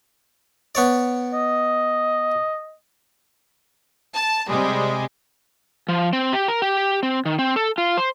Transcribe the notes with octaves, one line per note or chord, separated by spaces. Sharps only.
B3 C#5 D5
D#5
A5
C3 G3 G#3
F3
C4
G4
A#4
G4
C4
D#3
C4
A4
F4
C5